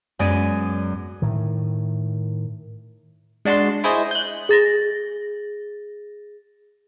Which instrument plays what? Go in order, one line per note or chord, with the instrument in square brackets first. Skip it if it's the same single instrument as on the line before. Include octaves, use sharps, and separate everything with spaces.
[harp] F#2 G#3 B3 G#4 D5 D#7
[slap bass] A2 D#3
[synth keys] G#3 D4 F#4 A5 C6
E4 G#4 C5 C#5 D#5
F#6 G6
[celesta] G#4 A6 A#6